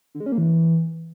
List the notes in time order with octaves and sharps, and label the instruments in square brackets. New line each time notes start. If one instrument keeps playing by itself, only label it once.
[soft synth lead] D3
G#3
C#4
A#3
E3